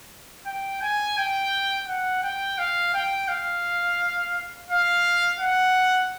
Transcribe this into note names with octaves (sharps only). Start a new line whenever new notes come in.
G5
G#5
G5
F#5
G5
F5
G5
F5
F5
F#5